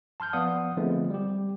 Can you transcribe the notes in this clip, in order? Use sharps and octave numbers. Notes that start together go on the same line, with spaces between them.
A5 C6 F6 G6
F3 B3 D5 F5 F#5 D#6
D3 F3 G#3 A3 B3 C4
G3 G4